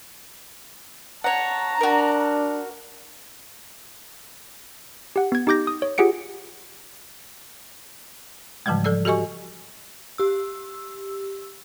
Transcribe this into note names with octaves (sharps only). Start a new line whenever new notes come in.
C#5 F#5 A5 A#5
D4 F#4 A#4
G4 F#5
B3 G#6
D#4 G4 D6 G6 A#6
D#6
C#5
F4 G4 G#4 F#5 C#7 D7
G#2 C#3 E3 F3 G3 G#3
F3 A4 D5 E6
F#4 G4 A4 D#5 G#5 C#6
G4 E6